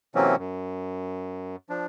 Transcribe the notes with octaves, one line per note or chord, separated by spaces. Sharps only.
C3 E3 F#3 A#3 C4 C#4
F#2
F3 D4